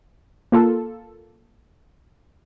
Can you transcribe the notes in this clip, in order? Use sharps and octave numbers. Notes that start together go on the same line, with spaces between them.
A#3 F4 A4